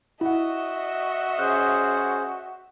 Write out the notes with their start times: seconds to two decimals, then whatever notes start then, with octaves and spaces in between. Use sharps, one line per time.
0.21 E4 F#4 D#5 E5 F#5
1.39 C#4 G#4 C5 F6 F#6